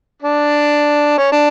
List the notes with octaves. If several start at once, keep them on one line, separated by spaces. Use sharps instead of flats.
D4
C#4
D4